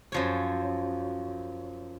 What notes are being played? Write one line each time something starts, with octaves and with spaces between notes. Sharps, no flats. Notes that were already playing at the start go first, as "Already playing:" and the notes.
F#2 F3 C#5